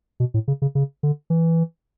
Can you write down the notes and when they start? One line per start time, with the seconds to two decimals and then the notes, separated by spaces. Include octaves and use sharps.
0.20 B2
0.34 A2
0.48 C#3
0.62 C#3
0.75 C#3
1.03 D3
1.30 E3